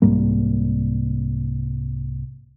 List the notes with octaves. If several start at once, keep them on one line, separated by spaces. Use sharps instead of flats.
C2 G#2 G3 A#3